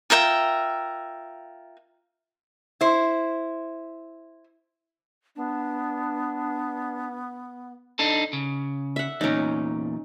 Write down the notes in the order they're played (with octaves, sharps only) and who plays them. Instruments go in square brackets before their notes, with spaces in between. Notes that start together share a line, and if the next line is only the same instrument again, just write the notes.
[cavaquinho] F4 A#4 E5 G5
[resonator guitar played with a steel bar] E4 C5
[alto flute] B3 [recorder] D4
[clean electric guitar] D4 D#4 A4
C#3
[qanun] E5 F#5
[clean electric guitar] E2 A#2 [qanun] C#4 D#4